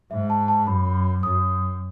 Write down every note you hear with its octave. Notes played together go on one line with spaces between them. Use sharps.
G#2 E5
A5
A5
F#2 B5
F#2 D#6